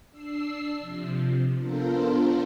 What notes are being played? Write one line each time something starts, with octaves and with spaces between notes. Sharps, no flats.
D4 E6 C7
C3 F3
B3 D4 F4 A4 A#4 C5